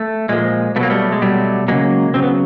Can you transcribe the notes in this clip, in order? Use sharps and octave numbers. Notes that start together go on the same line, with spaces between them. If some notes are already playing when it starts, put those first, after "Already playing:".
Already playing: A3
A#2 F3 G#3
B2 F#3 A3 A#3
G3 A3
G#3
B2 F#3 G3 A3
C#3 F#3 G#3 A#3
C#3 F#3 C4
B3